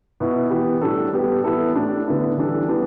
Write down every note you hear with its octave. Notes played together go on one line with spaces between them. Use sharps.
B2 B3 E4
E3 B3 G4
A2 G3 D4 A4
G3 B3 G4
E3 B3 E4 A4
A2 A3 D4 G4
D3 B3 E4 A4
E3 G3 D4 A4
E3 G3 B3 D4